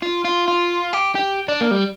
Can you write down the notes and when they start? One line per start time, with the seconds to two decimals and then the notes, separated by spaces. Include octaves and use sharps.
0.02 F4
0.24 F4
0.48 F4
0.93 G4
1.15 G4
1.48 D4
1.61 A#3
1.71 G3